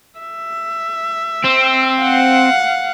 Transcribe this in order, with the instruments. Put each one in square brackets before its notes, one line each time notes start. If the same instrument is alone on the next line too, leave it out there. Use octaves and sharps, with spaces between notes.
[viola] E5
[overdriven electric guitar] C4
[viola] F5 F#5